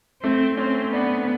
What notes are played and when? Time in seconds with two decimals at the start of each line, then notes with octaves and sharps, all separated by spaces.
0.23 A3 C4
0.57 C4 C#4
0.92 B3 D4